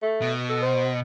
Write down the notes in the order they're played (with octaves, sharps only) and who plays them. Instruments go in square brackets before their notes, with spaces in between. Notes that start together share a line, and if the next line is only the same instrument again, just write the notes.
[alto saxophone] A3
[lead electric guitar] B2
[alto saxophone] A4
C5